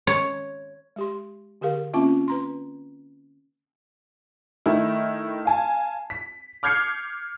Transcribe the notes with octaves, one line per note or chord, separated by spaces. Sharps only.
C#5
G#3 G4 C6
D3 G4 G#4 A#4 F5
A#3 C4 C#4 F4 E5 D6
B4 A#5 C6
D#3 A3 E4
F5 G#5 A5
B6
D6 F6 G6 G#6 C7 C#7